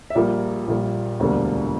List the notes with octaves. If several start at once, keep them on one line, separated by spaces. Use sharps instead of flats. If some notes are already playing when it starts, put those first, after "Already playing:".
E5
A#1 A#2 G3 A#3 D5
A#1 A#2 G3 A#3
E1 D2 D3 G3 A#3